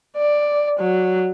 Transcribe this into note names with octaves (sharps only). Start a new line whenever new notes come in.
D5
F#3